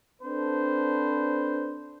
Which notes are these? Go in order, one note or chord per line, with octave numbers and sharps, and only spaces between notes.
C4 D4 A4 B4 C5